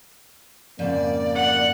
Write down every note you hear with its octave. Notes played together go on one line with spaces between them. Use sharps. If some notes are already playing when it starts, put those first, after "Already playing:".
F2 G#2 C#3 A#3 D5
F#5